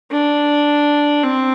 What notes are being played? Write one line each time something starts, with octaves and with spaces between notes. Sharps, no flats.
D4
C4